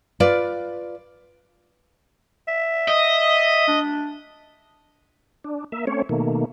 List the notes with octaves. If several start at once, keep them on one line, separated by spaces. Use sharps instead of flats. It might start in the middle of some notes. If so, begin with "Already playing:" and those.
F4 B4 D5
E5
D#5
D4
D4
A#3 E5
A3 C4 C#4 C#5
B2 D#3 A3 A#3